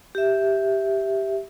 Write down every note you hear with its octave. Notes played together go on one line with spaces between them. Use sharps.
G4 E5